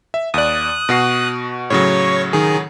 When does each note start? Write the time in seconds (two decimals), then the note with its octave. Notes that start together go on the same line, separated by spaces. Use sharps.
0.14 E5
0.34 D#2 D5 D#6 F#6
0.89 B2 F#4 C7
1.70 A2 C#3 F#3 C#5 C#6
2.33 D#3 G#4